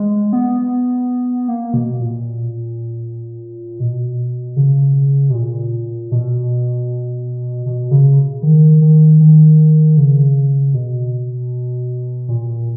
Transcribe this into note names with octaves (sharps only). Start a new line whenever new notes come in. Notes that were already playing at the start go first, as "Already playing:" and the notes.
Already playing: G#3
B3
A#3
B2
A#2
B2
C#3
B2
A#2
B2
B2
C#3
D#3
D#3
D#3
C#3
B2
A#2